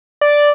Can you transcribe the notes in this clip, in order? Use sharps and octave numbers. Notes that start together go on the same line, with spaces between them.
D5